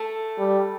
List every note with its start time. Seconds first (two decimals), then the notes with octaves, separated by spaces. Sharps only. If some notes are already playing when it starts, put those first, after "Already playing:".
Already playing: A3
0.38 G3